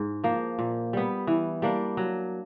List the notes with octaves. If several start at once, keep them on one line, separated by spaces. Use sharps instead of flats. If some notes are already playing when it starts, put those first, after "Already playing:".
Already playing: G#2
F3 A#3
A#2
G3 B3
E3
G3 A#3 D4
F#3